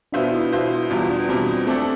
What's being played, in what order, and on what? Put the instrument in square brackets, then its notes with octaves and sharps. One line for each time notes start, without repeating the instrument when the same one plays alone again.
[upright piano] B2 B3 F4 C5 E5 [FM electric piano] D4
[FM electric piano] E4
[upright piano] B2 B3 F4 C5 E5
[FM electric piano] E4
[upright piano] E2 B2 G3 [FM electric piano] F4
[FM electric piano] D4
[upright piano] E2 B2 G3 [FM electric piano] C4
[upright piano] A3 D4 A4 [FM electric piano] C4